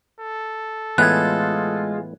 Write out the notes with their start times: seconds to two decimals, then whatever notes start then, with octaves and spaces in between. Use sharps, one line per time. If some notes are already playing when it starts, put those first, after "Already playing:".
0.20 A4
0.98 A2 E3 G#3 B3 F4 F#6 G#6